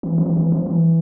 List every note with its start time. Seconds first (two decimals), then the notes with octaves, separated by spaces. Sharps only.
0.03 E3
0.18 F3
0.26 E3
0.37 E3
0.52 F3
0.66 E3